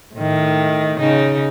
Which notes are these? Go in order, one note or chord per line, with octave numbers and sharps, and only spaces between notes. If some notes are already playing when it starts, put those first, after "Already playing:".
A2 D#3
C#3 D#4